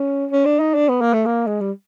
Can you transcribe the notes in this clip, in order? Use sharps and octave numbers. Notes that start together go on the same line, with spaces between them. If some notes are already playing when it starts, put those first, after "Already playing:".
Already playing: C#4
C#4
D4
D#4
D4
B3
A#3
A3
A#3
G#3
G3